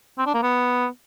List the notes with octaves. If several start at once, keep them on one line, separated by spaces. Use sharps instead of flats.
C4
D4
A#3
B3